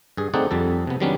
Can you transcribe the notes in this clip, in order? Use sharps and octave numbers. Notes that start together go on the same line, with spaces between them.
G2 G#4
A3 C4 D#4 G#4 D5 F#5
F2 G3 A4
C3 B3
D#3 F#3 G3 B3 C#4 D4